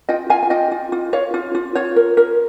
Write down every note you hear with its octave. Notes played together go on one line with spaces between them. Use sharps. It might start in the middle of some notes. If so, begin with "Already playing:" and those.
F4 D#5 G5
F4 F5 G#5
G#5
F4 D#5 G5
F4
F4
F4 C#5 F5
F4
F4
F4 C#5
A#4
A#4